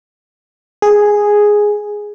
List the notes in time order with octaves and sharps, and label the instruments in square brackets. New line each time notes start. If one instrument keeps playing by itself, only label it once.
[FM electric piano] G#4